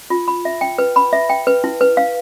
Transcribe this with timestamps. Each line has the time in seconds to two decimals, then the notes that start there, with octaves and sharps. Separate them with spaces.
0.10 F4
0.28 B5
0.45 E5
0.61 G5
0.78 B4
0.96 B5
1.13 E5
1.30 G5
1.47 B4
1.64 E4
1.81 B4
1.97 F5